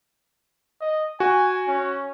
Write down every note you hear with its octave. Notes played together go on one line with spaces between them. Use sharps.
D#5
F#4 G#5
C#4